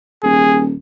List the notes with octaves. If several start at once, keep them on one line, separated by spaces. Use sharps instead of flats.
D#1 G#4